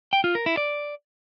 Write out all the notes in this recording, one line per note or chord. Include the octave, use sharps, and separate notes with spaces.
G5
F4
A#4
E4
D5